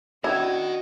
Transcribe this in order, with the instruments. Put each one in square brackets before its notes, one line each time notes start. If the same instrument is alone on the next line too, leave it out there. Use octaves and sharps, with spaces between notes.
[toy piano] C#4 D4 D5 [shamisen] E4 [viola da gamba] F#4 [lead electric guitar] A#4 D#5